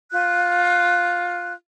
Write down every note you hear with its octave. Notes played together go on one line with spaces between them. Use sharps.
F4 F#6